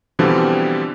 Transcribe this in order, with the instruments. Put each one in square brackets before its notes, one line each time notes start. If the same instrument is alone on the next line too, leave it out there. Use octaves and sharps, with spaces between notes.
[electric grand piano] B2 D3 E3 F3 G3 C4